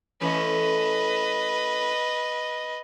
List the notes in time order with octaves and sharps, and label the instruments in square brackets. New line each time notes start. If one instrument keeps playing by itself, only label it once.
[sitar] E3 A3 C#4 [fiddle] B4 D#5